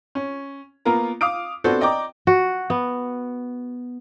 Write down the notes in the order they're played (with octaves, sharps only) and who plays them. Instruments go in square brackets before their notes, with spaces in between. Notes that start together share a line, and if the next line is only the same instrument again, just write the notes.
[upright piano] C#4
A#3 B3 F4 A#4 A#5
F5 D6 D#6 F6 D7
B3 C4 D4 F#4 A4 C5
D5 D#5 G5 A#5 D6
[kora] F#4
B3